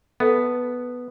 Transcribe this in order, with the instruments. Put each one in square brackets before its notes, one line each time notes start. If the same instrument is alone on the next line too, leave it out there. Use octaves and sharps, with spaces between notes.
[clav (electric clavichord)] B3 [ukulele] A4 E5